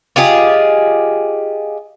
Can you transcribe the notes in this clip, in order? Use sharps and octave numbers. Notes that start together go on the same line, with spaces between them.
F4 G4 G#4 D#5